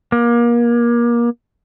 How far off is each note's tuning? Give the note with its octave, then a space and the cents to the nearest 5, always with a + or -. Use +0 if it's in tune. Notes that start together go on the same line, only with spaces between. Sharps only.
A#3 +30